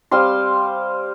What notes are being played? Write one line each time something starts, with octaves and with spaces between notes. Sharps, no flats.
G3 C4 F5 C6